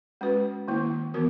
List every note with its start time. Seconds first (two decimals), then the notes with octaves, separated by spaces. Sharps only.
0.21 G#3 C#4 F#4 B4
0.68 D#3 A#3 E4
1.14 E3 B3 F#4 A#4